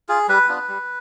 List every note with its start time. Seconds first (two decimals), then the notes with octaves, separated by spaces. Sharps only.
0.09 F4 G#4
0.28 G3 B4
0.48 B3 D4 F4
0.68 G3